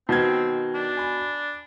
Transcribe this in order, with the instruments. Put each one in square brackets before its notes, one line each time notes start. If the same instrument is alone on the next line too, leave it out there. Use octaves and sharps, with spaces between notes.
[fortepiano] B2 [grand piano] D#3 B4 G#6 [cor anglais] C4
[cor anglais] D4
[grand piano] G#5 B5